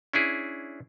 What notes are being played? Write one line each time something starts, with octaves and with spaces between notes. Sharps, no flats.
C#4 D4 E4 G#4